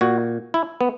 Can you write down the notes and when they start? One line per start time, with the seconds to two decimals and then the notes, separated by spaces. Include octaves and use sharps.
0.01 A#2 F#4
0.54 E4
0.81 B3